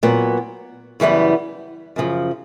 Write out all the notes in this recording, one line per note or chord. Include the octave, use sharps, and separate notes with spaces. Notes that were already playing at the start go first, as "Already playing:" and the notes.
A#2 F#3 B3
F#2 C#3 E3 G3 B3
F#2 C#3 F3